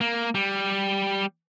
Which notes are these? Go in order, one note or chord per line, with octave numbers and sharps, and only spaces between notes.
A#3
G3